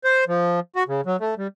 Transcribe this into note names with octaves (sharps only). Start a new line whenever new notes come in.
C5
F3
F#4
C#3
F#3
A3
G3